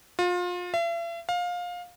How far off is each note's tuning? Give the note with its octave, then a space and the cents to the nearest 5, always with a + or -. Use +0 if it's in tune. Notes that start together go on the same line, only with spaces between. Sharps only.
F4 +30
E5 +45
F5 +20